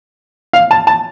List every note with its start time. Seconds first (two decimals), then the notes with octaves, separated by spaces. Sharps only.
0.53 F5
0.71 A5
0.87 A5